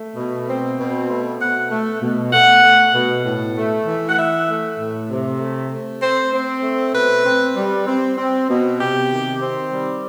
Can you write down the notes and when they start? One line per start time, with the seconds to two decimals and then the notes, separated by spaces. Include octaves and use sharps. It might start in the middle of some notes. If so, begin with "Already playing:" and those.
Already playing: A3
0.16 B2
0.47 C4
0.78 B2
1.09 A3
1.39 B2 F#5
1.70 A3
2.01 B2
2.32 A3 F#5
2.63 A3
2.94 B2
3.25 A2
3.55 A3
3.86 E3
4.07 F#5
4.17 E3 E5
4.48 A3
4.78 A2
5.09 C3
5.40 A3
5.71 A3
6.01 C4 C5
6.32 C4
6.63 A3
6.94 B2 B4
7.24 C4
7.56 G3
7.86 C4
8.17 C4
8.49 B2
8.79 C3 G4
9.10 D#3
9.41 C4
9.72 G3